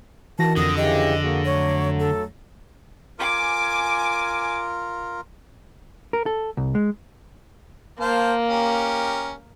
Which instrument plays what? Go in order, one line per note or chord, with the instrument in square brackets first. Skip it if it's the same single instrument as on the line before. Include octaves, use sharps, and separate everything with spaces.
[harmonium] D#3 [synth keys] E3 F#4 A#6 [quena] A5
[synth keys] F2 A#6 [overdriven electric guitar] D3 [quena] D#6
[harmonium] C#3 E3 G4 [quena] D#5
[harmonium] A#3 F#4 G#4
[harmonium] F#3 A3 [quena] C#5
[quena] A4
[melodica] F4 A#4 [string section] G#5 D6
[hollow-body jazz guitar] A#4
A4
C2
G#3
[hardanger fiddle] A#3 [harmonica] C5 F5 A5
[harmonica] C#4 G4 A#4